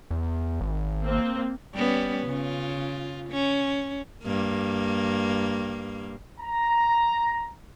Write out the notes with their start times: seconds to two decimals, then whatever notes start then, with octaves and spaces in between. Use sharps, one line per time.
0.11 E2
0.61 G#1
1.04 A#3 C4
1.75 G3 B3 C#4
2.27 C#3 F4
3.30 C#4
4.23 G2 A#3
6.41 A#5